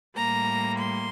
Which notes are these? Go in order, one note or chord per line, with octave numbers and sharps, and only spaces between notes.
A2 G3 A#3 A#5
C6